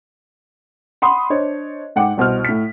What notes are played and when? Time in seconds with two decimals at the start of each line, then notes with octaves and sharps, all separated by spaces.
1.02 F#5 B5 C6 D#6
1.30 D4 C5 C#5 D#5
1.96 G#2 F#5 G5 D6
2.17 C2 B2 C5 F6
2.45 A2 B6